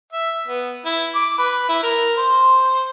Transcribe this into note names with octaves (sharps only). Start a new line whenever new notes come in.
E5
B3
E4
D6
B4
E4
A#4
C5